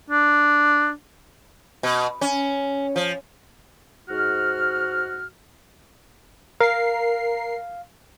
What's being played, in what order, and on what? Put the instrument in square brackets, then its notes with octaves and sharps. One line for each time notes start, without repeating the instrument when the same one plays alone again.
[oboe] D4
[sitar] B2
C#4
F3
[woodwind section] G#2 F#4 F6
[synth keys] A#4 C7 [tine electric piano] F5